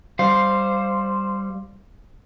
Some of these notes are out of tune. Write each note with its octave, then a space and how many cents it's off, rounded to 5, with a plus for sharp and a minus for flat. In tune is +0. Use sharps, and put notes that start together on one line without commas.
G3 +0 C5 +0 F5 +5